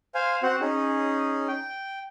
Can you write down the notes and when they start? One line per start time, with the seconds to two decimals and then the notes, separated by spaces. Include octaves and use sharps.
0.15 C5 F5 G#5
0.43 C4 F#4 C5 F#5
0.61 C#4 D#4 G#4
1.48 G5